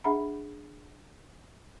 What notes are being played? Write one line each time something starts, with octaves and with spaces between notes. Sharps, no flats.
D4 G#4 E5 F#5 A#5 B5